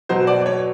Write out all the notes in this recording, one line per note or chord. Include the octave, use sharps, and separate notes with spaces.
B2 F#3 C5
D5
C#5